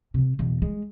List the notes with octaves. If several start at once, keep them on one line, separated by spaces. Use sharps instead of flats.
C3 C4
E2 B2
G#3